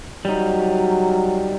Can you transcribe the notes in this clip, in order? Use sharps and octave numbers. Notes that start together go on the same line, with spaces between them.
F#3 G3 D#4